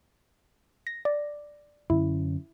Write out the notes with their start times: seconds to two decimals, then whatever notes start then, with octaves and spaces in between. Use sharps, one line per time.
0.87 A#6
1.05 D5
1.90 F#2 D3 C#4 E4